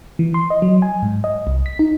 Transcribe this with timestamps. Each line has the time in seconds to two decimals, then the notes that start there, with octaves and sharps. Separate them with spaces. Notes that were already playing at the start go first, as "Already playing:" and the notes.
0.19 E3
0.34 C6
0.50 D#5
0.62 F#3
0.82 G#5
1.02 G#2
1.24 D#5
1.47 C2
1.66 B6
1.79 D#4